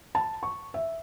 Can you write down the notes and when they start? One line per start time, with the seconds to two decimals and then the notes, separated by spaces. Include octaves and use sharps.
0.15 A5
0.43 C#6
0.74 E5